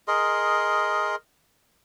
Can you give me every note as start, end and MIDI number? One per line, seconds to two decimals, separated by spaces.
0.08 1.15 68
0.08 1.15 70
0.08 1.15 75
0.08 1.15 84